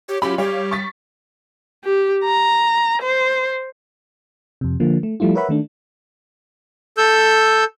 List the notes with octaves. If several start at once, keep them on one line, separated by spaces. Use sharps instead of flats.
G4 C#5
F#3 C#4 F4 G4 B5
G3 G4 C#5 F5
C#6 A6 B6
G4
A#5
C5
F2 C3
D3 F3 A#3
A3
F3 G3 A3 E4 F4
A#4 B4 C#5 E5 F#5 B5
D#3 A3 D4
A4 E6 G6